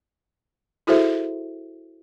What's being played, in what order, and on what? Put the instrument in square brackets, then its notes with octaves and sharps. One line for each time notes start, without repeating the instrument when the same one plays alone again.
[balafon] E4 F#4 G#4 A4 C5 E5